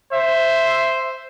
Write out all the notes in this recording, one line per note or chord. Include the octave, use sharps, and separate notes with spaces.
C5 E5